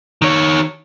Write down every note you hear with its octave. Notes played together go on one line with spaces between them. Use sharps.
D#3 C#5